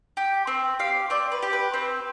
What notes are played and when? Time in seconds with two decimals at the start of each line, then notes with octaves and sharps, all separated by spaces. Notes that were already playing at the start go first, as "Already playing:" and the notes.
0.17 G4
0.47 C4
0.79 G4 F5
1.10 C4 D5
1.32 B4
1.42 G4
1.53 B4
1.74 C4